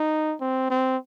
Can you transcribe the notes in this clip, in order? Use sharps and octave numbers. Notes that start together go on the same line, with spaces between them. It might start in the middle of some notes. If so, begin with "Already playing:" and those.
Already playing: D#4
C4
C4